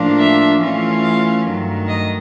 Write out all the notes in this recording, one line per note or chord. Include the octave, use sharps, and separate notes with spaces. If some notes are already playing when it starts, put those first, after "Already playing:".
Already playing: A2 F3 A#3 D4 F4
E5
E3 A3 C#4 F4
F5
G2 D#3 F#3 A3
D#5